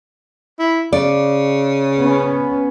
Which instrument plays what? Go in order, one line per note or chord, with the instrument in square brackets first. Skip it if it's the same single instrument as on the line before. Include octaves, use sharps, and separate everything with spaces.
[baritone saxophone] E4
[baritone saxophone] C#3 [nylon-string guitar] D5
[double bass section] B3 C#4